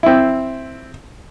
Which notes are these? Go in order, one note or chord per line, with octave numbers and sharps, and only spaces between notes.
C4 E4